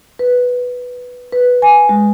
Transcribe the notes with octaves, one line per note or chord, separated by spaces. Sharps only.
B4
B4
G#5
G#3